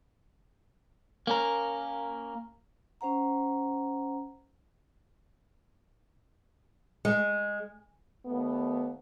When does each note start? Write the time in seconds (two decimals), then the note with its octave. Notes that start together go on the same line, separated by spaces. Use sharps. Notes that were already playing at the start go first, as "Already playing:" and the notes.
1.27 A#3 C#4 A#4
3.01 C#4 C5 F#5 A#5
7.05 G#3
8.26 D#2 A3 B3